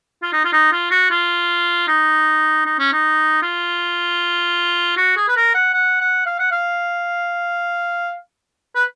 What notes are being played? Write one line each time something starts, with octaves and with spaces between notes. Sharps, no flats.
F4
D#4
F4
D#4
F4
F#4
F4
D#4
D#4
C#4
D#4
F4
F#4
G#4
B4
A#4
F#5
F#5
F#5
F5
F#5
F5
B4